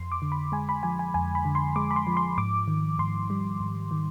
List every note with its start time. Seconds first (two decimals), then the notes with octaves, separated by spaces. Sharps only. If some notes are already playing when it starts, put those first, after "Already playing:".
Already playing: F2 C6
0.12 D6
0.22 D3
0.32 B5
0.52 G#3 G#5
0.69 B5
0.83 F3 G#5
0.99 G#5
1.14 F2 G#5
1.35 B5
1.45 D3
1.55 C6
1.76 G#3 D6
1.91 B5
1.96 C6
2.07 F3
2.17 C6
2.38 G#2 D6
2.68 D#3
2.99 G#2 C6
3.30 G3
3.60 G#2
3.91 D#3